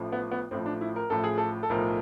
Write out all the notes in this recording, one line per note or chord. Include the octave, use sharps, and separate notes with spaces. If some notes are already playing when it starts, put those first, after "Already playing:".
Already playing: A1 A2 F3
B3
B3
A1 A2 F3 C4
D4
E4
A#4
A1 A2 F3 A4
G#4
A4
A4
B1 A2 F3 A#4